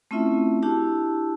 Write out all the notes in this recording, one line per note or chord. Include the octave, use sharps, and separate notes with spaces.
A3 C4 C#4 E4 F4 E5
D4 E4 F#4 G4 A5 E6